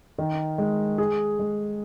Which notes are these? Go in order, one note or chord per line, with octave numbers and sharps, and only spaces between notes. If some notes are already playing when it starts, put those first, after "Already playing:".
D#3
G#3
G#4
G#3